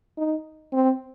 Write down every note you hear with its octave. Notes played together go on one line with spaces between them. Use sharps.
D#4
C4